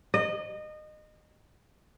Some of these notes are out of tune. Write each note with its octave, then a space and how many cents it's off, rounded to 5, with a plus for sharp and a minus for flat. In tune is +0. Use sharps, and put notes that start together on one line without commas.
D#5 -25